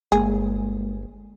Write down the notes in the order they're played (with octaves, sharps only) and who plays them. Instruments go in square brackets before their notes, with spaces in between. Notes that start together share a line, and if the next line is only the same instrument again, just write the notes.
[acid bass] G1 [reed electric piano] G#3 A#3 [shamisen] G#4